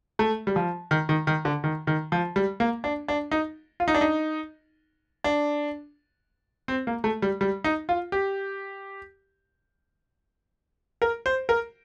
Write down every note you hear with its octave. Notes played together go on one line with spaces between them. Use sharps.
A3
G3
F3
D#3
D#3
D#3
D3
D#3
D#3
F3
G3
A#3
D4
D4
D#4
F4
D#4
D4
D#4
D4
C4
A#3
A3
G3
G3
D#4
F4
G4
A#4
C5
A#4